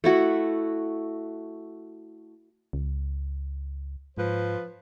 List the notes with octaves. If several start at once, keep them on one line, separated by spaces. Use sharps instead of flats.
A3 E4 F#4
C#2
G#2 F3 B4 C5